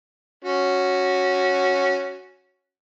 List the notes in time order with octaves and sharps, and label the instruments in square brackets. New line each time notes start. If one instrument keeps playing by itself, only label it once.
[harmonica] C#4 F#4